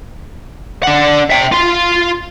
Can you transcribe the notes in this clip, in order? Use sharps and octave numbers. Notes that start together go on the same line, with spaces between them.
D4 F#5
E5 G5
F4 C6